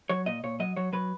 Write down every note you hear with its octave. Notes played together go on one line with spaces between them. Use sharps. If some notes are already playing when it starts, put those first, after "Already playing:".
F#3 C#5
A#2 D#5
A#2 C#5
F#3 D#5
F#3 C#5
F#3 B4